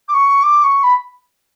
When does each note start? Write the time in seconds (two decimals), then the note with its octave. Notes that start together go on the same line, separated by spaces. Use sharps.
0.08 D6
0.14 C#6
0.43 D6
0.63 C#6
0.83 B5